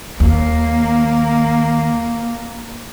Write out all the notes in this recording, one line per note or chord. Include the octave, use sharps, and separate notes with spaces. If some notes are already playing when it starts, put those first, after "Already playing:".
D#2 A#3